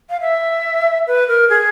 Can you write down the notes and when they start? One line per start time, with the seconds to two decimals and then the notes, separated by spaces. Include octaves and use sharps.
0.10 F5
0.21 E5
1.07 B4
1.28 A#4
1.50 G#4